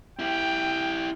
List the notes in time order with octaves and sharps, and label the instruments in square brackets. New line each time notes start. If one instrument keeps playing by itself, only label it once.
[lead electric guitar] E4 G4 [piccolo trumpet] G5